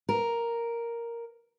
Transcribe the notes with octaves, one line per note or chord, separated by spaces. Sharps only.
A#4